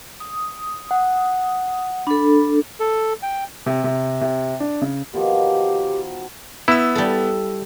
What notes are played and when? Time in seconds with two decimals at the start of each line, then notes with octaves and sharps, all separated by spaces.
0.20 D#6
0.91 F#5
2.07 D4 A4 B5
2.80 A4
3.23 G5
3.66 C3
3.84 C3
4.21 C3
4.60 D4
4.82 C#3
5.14 B2 D#3 F3 G4
6.68 B3 E4 E6
6.95 G3 A4